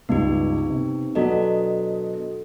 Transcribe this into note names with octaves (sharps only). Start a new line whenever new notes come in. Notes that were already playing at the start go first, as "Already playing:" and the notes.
C#2 G2 B3 D#4 G4
C3
B2 F#3 D4 F#4 A4 D#5